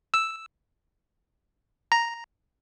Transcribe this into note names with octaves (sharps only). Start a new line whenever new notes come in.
E6
A#5